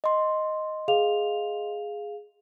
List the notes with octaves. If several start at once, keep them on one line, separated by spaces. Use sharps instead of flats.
D#5 C6
G#4 F5 F7